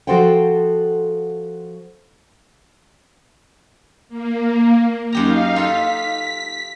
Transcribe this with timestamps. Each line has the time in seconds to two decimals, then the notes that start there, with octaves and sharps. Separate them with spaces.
0.07 F3 F#4 A4 C5 F#5 G5
4.09 A#3
5.12 F#2 D#4 G4 F5 A#5
5.56 F4 A4 B6